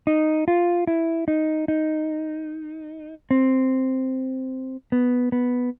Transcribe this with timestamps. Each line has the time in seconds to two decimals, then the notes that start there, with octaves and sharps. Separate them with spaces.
0.07 D#4
0.48 F4
0.87 E4
1.28 D#4
1.68 D#4
3.31 C4
4.92 B3
5.32 B3